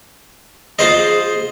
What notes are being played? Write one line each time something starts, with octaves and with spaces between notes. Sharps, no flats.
F4 G#4 C5 D#5